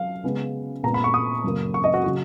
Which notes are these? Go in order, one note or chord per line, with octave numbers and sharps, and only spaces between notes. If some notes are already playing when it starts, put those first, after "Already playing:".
Already playing: F#3 F5
C#3 G#3 B3
A#2 G#3 B3 A#5
B5
C#6
D#6
F#2 C#3 F#3 A#3
C#6
D#5
F#4
C#3 F#3 F#4